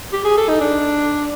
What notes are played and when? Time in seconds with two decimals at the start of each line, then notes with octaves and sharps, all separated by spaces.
0.13 G4
0.25 G#4
0.37 A4
0.49 D#4
0.61 D4